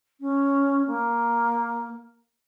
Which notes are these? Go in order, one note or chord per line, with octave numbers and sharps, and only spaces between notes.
C#4
A#3